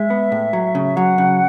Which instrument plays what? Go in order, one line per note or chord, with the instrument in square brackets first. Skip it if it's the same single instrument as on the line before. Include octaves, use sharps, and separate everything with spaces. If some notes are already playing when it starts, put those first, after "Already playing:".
Already playing: [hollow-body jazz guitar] G#3 [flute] E5
[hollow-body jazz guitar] B3
A2
F#3
C#3
[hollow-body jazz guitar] F#3 [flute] F#5
[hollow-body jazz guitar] C#3